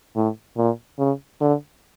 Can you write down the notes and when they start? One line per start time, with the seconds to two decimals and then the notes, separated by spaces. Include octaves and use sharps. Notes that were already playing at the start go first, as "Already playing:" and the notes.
0.16 A2
0.57 A#2
0.99 C#3
1.41 D3